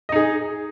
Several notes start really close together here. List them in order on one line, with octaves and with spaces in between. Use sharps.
D#5 D#4 G#4